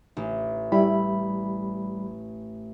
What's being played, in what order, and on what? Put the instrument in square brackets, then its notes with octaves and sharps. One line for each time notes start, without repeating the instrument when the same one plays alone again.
[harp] A1
[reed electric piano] G3 B5 [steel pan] E4